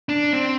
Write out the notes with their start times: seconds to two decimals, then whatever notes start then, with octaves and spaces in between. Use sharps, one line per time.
0.09 D4
0.33 C4